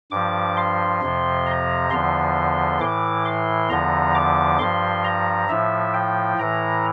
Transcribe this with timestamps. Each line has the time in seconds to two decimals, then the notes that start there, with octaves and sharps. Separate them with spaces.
0.11 G2 F3 D6
0.57 C6
1.02 F2 C3 F3
1.46 A#5
1.90 E2 D3 F3 C6
2.80 A2 E3 D6
3.25 C6
3.69 E2 D3 F3 A#5
4.15 D6
4.59 G2 F3 C6
5.04 A#5
5.49 A2 F3 E5
5.94 G5
6.38 A2 E3 A#5